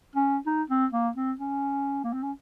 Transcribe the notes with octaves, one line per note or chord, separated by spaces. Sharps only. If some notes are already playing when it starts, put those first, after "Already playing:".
C#4
D#4
C4
A#3
C4
C#4
A#3
C4
C#4